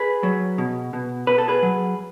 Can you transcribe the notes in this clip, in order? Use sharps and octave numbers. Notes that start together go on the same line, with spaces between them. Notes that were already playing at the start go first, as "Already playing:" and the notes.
Already playing: G#4 B4
F#3
B2
B2
B2 B4
A4
G#4 B4
F#3